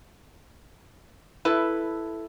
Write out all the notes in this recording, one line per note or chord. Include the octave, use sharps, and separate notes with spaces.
E4 A4 B4